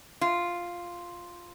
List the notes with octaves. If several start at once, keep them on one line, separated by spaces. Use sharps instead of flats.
F4